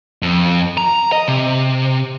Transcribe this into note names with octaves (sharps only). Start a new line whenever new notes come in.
F2
A#5
D#5
C3